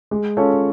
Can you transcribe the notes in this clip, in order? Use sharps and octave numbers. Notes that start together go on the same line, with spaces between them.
G#3
C#4 F4 A4 C#5